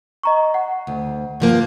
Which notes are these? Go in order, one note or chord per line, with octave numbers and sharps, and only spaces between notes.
D#5 A#5 C#6
F#5
D2
G2 F3 A#3